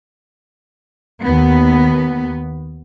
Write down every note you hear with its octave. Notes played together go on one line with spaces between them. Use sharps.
D#2 B3